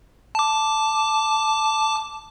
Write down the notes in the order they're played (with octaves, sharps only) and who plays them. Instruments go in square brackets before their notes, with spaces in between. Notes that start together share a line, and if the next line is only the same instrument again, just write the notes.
[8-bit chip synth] A5 D6